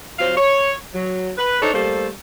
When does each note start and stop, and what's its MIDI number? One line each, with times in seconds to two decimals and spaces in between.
0.19 0.36 54
0.19 0.36 60
0.19 0.36 65
0.19 0.36 72
0.19 0.36 77
0.37 0.74 73
0.94 1.31 54
1.38 1.60 71
1.62 1.71 62
1.62 1.71 63
1.62 1.71 69
1.62 1.71 72
1.62 1.71 73
1.74 2.07 55
1.74 2.07 57
1.74 2.07 58
1.74 2.07 69
1.74 2.07 72